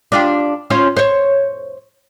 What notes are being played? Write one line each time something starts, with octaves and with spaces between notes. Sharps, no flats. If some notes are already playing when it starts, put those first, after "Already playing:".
D4 F4 G4
C#4 F4 C5
C5 C#5